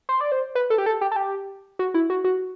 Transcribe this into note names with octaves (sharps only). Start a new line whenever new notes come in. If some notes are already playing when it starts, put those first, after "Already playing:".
C5
D5
C5
B4
A4
G4
A4
G4
A4
G4
F#4
E4
F#4
F#4